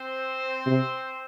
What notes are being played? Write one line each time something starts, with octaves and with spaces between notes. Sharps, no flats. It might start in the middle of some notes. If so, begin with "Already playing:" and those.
Already playing: C4 C5
C3